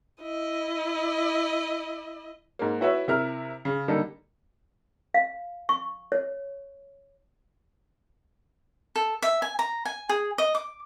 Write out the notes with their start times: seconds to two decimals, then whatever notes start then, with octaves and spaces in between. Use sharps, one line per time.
0.22 E4 D#5
2.59 G#2 A#3
2.81 E4 F#4 B4 C#5 E5
3.08 C3 E4 A#4 F6
3.65 C#3
3.88 D3 G3 A#3 D#4 A4
5.14 F5
5.69 C#6
6.12 C#5
8.96 A4
9.22 E5
9.42 G#5
9.59 A#5
9.85 G#5
10.09 G#4
10.38 D#5
10.55 D6